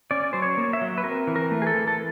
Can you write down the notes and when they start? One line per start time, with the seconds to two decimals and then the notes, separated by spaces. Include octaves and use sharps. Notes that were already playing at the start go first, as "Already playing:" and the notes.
0.11 C#4 D5
0.33 F#3 C5
0.42 C#5
0.57 A#3
0.73 E5
0.81 F#3
0.98 B4
1.04 C4 A#4
1.27 E3
1.36 A#4
1.51 A3
1.62 G#4
1.67 A4
1.74 E3
1.88 A4